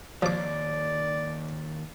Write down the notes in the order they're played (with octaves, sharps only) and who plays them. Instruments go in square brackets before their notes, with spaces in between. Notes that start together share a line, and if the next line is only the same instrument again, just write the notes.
[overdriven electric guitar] D#2 [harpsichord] F3 D6 [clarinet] D5